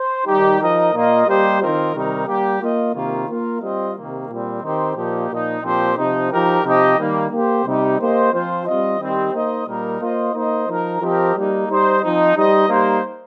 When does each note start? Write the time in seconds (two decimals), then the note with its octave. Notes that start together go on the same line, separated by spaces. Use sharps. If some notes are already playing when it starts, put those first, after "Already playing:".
Already playing: C5
0.26 D#3 G3 D#4 G4
0.60 F3 D#4 A#4 D#5
0.93 A#2 A#3 F4 D#5
1.27 G3 A#3 G4 C5 D#5
1.60 D#3 C4 F4 A#4 D#5
1.94 C3 D#3 G3 D#4 A#4
2.27 G3 A#3 G4
2.61 A#3 F4 D#5
2.94 C3 D#3 A#3 F4
3.28 A#3 F4 A#4
3.62 G3 C4 F4 D#5
3.96 C3 D#3 A#3
4.29 A#2 G3 C4
4.63 D#3 C4 D#4 G4 C5
4.96 A#2 F3 A#3 D#4 G4
5.30 A#2 F3 D#4
5.63 A#2 F3 C4 G4 C5
5.97 C3 F3 D#4
6.31 F3 D#4 G4 A#4
6.65 C3 F3 D#4 G4 D#5
6.98 D#3 G3 A#3
7.31 A#3 G4 C5
7.65 C3 G3 D#4 G4
7.99 A#3 G4 C5 D#5
8.33 F3 C4 F4 C5
8.66 G3 C4 F4 D#5
8.99 D#3 G3 C4 G4 D#5
9.33 A#3 D#4 C5 D#5
9.67 A#2 G3 A#3 D#4 A#4
10.01 A#3 F4 C5 D#5
10.34 A#3 D#4 C5 D#5
10.68 F3 D#4 A#4
11.01 F3 C4 G4 A#4 D#5
11.35 G3 A#3 D#4
11.69 G3 D#4 C5 D#5
12.02 F3 C4 D#4
12.36 G3 D#4 C5 D#5
12.69 G3 A#3 D#4 C5